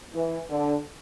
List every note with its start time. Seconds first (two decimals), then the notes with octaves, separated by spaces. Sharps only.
0.14 E3
0.50 D3